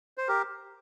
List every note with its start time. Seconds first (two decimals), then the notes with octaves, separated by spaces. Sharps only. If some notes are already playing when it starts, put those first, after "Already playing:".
0.18 C5
0.28 G4 A#4